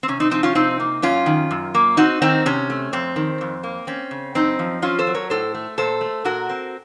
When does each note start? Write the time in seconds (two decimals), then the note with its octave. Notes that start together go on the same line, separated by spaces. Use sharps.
0.03 C4
0.08 C3 C#4
0.20 C4 D#4
0.31 F3 C4 D#4
0.43 C#4 F4
0.55 C3 C4 D#4
0.80 A#3
1.02 F#2 C#4 F4
1.26 D#3
1.51 F#2
1.75 A#3
1.97 C4 D#4 F#4
2.22 D#3 C4 D#4
2.46 C3 C#4
2.70 A3
2.93 F2 C4
3.16 D#3
3.41 F2
3.63 A#3
3.87 C4 C#4
4.11 C#3
4.35 F#2 C4 D#4
4.59 F3
4.82 C4 C#4 F4
4.99 A4 C5
5.07 F#3
5.14 A#4 C#5
5.30 A2 A4 C5
5.55 A3
5.78 A#2 A4 C5
6.01 A3
6.25 A#2 F#4 A#4
6.49 C4